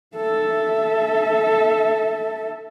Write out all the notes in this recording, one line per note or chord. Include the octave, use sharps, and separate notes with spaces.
A4 E5